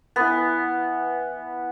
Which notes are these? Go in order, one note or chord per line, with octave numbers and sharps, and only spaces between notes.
E3 B3 B4